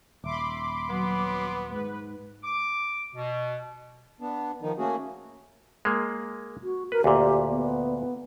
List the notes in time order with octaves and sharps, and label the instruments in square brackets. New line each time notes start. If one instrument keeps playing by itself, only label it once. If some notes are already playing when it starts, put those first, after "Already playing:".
[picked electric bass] D#1 [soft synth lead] E5 [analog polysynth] B5 C6 D6
[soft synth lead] F#3 [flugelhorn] B3
[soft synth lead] G#2 [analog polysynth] B4
[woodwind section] D6
B2
[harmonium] B3 D4
D#3 F3 D#4
A3 A#3 C#4 F#4 G#4
[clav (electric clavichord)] G#3 A#3
[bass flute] F#4
[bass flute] A#4 [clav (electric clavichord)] B4
[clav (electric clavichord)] D2 A#2 [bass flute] G4
[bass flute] B3